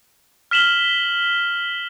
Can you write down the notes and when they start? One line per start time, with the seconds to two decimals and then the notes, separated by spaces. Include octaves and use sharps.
0.51 F6 B6 E7 F#7 G7